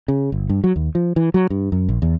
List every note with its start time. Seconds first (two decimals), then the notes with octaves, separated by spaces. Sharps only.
0.08 C#3
0.32 G1
0.49 G2
0.64 F#3
0.76 D#2
0.95 F3
1.16 E3
1.34 F#3
1.50 G2
1.72 F#2
1.89 A#1
2.02 E2